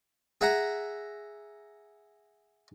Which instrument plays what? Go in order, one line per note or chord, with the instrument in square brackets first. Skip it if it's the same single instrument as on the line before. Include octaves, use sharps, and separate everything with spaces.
[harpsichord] G#4 E5 F#5 A#5